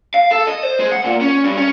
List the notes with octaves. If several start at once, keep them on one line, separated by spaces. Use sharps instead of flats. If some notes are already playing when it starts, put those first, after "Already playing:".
F5
A4
D#5
C5
G#3
F#5
A#2
C#4
G2
C#4